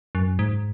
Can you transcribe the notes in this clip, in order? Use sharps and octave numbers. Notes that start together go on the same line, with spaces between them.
F#2
G#2